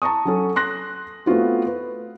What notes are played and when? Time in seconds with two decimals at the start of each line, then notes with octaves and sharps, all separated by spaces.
0.02 A5 A#5 C#6 D#6
0.25 F#3 C#4 A4
0.56 C6 F#6 A#6
1.26 A3 B3 C4 F4 F#4
1.67 B4